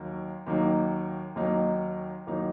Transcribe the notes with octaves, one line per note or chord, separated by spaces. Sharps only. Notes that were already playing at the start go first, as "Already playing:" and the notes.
Already playing: D#2 F#3 A#3 D#4
D#2 D#3 F#3 A#3 D#4
D#2 D#3 F#3 A#3 D#4
D#2 D#3 F#3 A#3 D#4